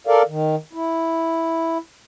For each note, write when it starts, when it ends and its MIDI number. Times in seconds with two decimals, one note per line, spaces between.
0.07 0.22 69
0.07 0.22 70
0.07 0.22 74
0.07 0.22 77
0.28 0.56 51
0.73 1.78 64